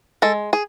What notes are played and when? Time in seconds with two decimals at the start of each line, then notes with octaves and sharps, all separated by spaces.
0.22 G#3 A4
0.53 G#4